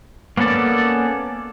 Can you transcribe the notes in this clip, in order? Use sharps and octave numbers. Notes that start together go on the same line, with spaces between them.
A#3 B3 C#4 A4 D5